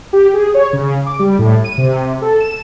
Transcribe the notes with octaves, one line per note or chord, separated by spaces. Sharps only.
G4
G#4
C#5
C#3
D6
G3
A2
D#7
C3
A4
E7